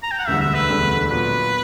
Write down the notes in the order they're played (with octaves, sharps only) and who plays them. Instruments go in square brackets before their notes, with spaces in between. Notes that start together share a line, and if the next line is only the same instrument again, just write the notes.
[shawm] A#5
G5
F#5
[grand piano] E1 D2 D3 G3 [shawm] E5
[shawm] E5
B4
[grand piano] E1 D2 D3 G3
[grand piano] A#2 F#3 B3 [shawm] B4